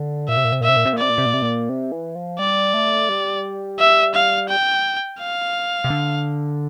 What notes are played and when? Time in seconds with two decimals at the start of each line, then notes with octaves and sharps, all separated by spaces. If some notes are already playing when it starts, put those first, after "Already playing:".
Already playing: D3
0.28 A#2 E5
0.37 C3
0.45 A#2
0.52 C3
0.61 A#2 E5
0.69 C3
0.77 A#2
0.85 C3
0.93 A#2
0.98 C3 D5
1.10 A#2
1.18 C3
1.26 A#2
1.34 C3
1.42 A#2
1.69 C3
1.92 E3
2.15 F3
2.39 G3 D5
2.74 A3
3.09 G3
3.79 E5
4.14 F5
4.49 G5
5.20 F5
5.84 C3
5.90 D3